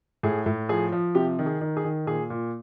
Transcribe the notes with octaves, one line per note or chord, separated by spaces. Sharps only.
A2 G#4
A2
F3 G#4
F3
C3 G4
D#3
G#4
D#3
G#4
D#3
A#2 G#4
A#2